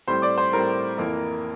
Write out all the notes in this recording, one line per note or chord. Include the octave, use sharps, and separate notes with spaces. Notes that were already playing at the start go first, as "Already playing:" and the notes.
A2 G3 C4 C5 C6
D5 D6
C5 C6
A2 G3 C4 A#4 A#5
F2 E3 A#3